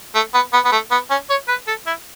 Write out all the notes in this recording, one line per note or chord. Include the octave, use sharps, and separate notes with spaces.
A3
B3
B3
B3
A3
B3
C#4
C#5
B4
A4
E4